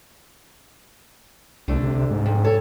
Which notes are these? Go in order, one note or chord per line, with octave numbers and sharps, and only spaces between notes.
C2 D3 A3 D4
C3
G#2
F2
A4 C#5